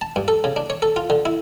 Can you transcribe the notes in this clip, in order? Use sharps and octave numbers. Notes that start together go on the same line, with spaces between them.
A5
G2
A4
C#3
D4
C#5
A4
F4
D3
E4